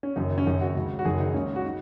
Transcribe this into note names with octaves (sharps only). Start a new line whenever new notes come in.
C#4
F#1 F#2 D#3 D#4
C#4
F#1 F#2 D#3 D#4
F#4
C#2 C#3
F#4
F#1 F#2 D#3 G#4
D#4
C#2 C#3 C#4
F#4
D#4